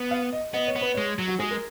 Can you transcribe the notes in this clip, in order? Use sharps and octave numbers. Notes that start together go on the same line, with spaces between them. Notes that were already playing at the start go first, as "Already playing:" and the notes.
Already playing: B3
F5
D#5
B3 D#5
C#5
B3
B4
G#3 C#5
F#3
F#4
G#3 G#4
A#4